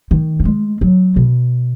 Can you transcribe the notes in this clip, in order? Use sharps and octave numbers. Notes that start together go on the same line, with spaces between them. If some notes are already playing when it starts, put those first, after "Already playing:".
D#3
F#3
G#3
F#3
B2